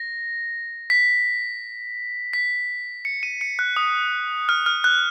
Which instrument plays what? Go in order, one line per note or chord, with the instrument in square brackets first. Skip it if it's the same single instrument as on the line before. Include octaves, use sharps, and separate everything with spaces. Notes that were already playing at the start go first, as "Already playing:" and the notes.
Already playing: [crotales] A#6
B6
B6
C#7
D#7
C#7
F#6
D#6
F6
F6
F#6